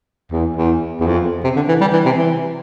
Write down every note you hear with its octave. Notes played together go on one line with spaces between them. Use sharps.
E2
E2
E2
F2
C3
D3
E3
G3
E3
C3
E3